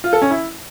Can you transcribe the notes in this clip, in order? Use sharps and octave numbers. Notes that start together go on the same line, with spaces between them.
F4
A4
C#4
E4